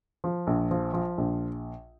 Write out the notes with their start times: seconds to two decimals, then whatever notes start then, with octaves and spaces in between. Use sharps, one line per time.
0.24 F3
0.47 A#1
0.71 F3
0.93 F3
1.18 A#1